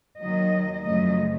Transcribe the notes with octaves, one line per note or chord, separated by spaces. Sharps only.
D#2 D#3 F#3 D#5
F#2 C#3 F3 A3 D#5